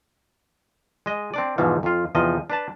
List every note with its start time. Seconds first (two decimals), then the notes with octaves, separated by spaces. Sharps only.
1.06 G#3 D#5
1.34 C4 D4 D5
1.58 E2 G#2 B2 E3 F3
1.83 F2 F4
2.15 E2 C3 F3 D#5
2.50 D4 B4 A5